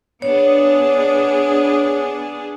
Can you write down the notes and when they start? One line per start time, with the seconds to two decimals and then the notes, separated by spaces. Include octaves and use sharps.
0.22 B3 D4 G#4 C#5